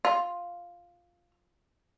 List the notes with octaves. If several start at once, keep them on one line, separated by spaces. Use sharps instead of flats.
F4